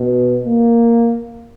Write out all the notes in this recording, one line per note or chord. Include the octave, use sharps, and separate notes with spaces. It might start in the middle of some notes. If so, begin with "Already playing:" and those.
Already playing: B2
A#3